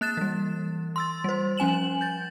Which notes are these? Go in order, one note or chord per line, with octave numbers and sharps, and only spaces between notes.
A#3 F#6 A6 E7
E3 G3
C6 E6 A6
G3 C5
F3 C#4 G#5 E7 F#7
G6 A6